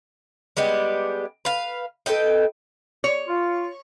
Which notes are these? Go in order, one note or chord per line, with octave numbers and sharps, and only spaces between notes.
G3 G#3 B3 G4
B4 F5
A4 B4 D#5 G5
C#5
F4